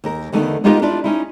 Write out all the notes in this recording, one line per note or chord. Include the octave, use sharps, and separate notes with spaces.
D#2 A#4
E2 D3 D#3 A3 B3 D#4
G#3 B3 D#4 F4 G4 A#4
D4 E4 F4 D5
C#4 D#4 E4